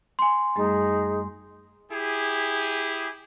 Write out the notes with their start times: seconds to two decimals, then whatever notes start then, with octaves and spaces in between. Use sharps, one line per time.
0.19 G#5 C6
0.56 F#2 G3 A3 D#4 G#4
1.91 E4 G4 G#4